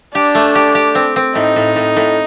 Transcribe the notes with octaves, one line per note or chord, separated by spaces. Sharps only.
D4 G4
A3
G4
G4
C4
C4
A2 D#4
A2
A2
A2